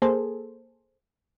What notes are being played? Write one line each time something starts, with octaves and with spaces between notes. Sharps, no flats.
A#3 G#4 A4 C5